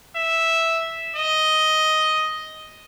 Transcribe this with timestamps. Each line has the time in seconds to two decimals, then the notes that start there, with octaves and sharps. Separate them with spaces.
0.16 E5
1.16 D#5